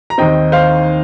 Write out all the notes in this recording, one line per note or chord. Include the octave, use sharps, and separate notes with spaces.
A#5
D#2 D#3 C4 D#5 G5
C5 F5